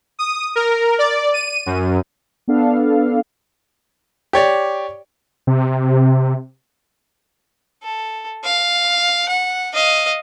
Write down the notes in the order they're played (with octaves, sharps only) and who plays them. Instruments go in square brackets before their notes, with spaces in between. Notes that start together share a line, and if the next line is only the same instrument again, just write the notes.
[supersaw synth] D#6
A#4
D5
D#7
F#2
[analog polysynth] B3 D4 A4 F5
[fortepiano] G4 C#5 D5
[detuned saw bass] C3
[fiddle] A4
F5
F#5
D#5 F5